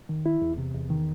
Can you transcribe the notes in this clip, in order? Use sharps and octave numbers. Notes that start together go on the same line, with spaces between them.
D#3
E4
E2
C3
E2
D#3